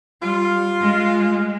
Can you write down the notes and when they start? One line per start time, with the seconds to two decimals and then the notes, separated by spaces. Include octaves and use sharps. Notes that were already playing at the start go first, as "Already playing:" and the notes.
0.22 G3 F4
0.81 G#3